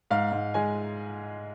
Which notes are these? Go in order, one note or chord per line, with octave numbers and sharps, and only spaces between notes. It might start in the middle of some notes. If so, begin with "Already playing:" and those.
G#2 F5
G#2
G#3 G#5